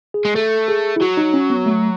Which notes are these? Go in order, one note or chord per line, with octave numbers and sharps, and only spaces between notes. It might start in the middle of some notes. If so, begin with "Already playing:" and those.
G#4
G#3
A3 A4
G#4
E4
F#3 F#4
D#4
C#4
B3
A3